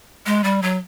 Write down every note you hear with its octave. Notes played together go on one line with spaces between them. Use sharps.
G#3
G3
F#3